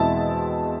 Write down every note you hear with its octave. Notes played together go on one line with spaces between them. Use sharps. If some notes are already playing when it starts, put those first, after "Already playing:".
Already playing: E2 B2 G#3 C4 E4 A5